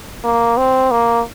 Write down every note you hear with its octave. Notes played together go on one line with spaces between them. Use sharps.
A#3
C4
A#3